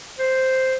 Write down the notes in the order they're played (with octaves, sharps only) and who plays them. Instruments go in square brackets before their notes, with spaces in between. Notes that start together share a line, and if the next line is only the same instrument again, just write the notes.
[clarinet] C5